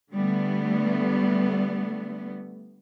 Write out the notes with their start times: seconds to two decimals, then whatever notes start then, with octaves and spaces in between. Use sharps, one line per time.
0.14 D3 G3 A3 B3